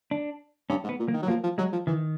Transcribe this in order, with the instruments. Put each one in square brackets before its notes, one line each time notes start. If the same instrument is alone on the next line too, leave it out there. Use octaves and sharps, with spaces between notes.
[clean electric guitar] D4
[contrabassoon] G2 [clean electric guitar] C#4
[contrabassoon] G#2
[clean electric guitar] B3
[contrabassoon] A#2
[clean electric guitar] A#3
[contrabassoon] D#3
F#3
[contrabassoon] F3 [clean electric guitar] A#3
[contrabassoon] F3
[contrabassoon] F#3 [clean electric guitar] G#3
[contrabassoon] F3
[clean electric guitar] D#3 [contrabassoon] E3